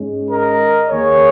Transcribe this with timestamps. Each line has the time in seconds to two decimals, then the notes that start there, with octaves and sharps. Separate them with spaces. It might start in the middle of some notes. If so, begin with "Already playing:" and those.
Already playing: G#2 G#3 C#4
0.29 A#4 D#5
0.89 D#2 D#3 A#3 G#4 C#5